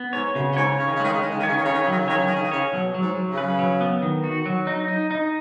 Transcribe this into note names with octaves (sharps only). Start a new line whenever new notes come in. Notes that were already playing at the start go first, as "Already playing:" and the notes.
Already playing: B3
G#2 C#5
F#2 C#3
B2
G#2 C#5
C#3 C#5
D#3
C#3
D#3 G#3
C#3
D#3 G#3
C#3
D#3
C#3 C#5
D#3
C#3 C#5
D#3
C#3
F#3
D#3
C#3
D#3 C#5
C#3
D#3 G#4
C#3
D#3
C#3 C#5
B2 F#3
F#3
G#2
F#3
C#3
B4
F#3
B3
D#3
F#4
F#3
D#4
D#4
D#4